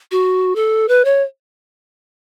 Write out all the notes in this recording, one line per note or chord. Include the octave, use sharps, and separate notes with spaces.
F#4
A4
B4
C#5